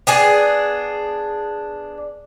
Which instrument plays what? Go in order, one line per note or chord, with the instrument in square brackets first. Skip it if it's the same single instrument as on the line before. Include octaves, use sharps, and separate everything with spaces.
[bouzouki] B3 D4 G#4